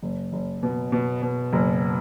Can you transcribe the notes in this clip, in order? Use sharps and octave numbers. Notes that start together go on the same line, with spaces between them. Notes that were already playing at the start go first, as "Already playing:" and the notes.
F#1
F#1
B2
B2
B2
F#1